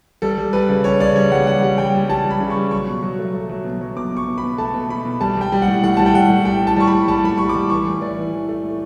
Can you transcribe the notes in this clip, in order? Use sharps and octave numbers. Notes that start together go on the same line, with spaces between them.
G3 A4
G3
G3 B4
C#3
G3 C#5
C#3 D5
G3 C#5
G3 F#5
G3 F#5
G3
G3 G5
G3
G3 A5
G3
B5
C#3
C#6
G3
F#3 C#6
B2
F#3
A3
A3
F#3
B2
F#3
B2 D6
B2 C#6
B2
B5
B2
A3 A5
B2
B2 B5
B2
G3 A5
G3 G5
G3
F#5
A2
A2 F#5
G3 A5
G5
G3 F#5
A2
G3 G5
A2
A5
G3 C#6
B5
G3
G3 A5
A2 B5
G3 C#6
D6
G3
E3 C#6
A2
E3 D5
E3
E3
A3
A2